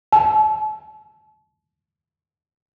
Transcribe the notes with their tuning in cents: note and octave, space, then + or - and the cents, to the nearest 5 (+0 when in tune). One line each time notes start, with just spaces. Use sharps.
A5 -35